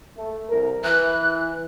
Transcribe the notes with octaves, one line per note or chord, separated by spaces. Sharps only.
A3
C2 A#4
E3 F#6